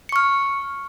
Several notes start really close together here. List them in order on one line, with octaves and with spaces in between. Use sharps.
C#7 C#6 F6